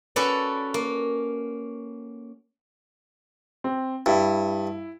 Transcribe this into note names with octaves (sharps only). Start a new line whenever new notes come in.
C#4 F#4 A4 B4 D5
A#3
C4
G2 E4